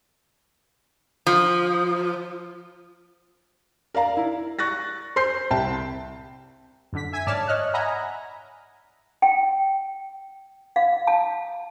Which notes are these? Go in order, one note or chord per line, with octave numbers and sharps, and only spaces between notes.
F3
A#4 D5 F5 A#5
E4
C#6 F#6 A6 A#6
C5 C6 G6 C7
C2 E5 G5 A5
F#2 D3 B6
E5 G#5 G#6 B6
G#2 C#5 D5 A5 F6
C#5 D#5 F6 F#6
D#5 E5 F#5 G#5 A#5 B5
G5
F5
A5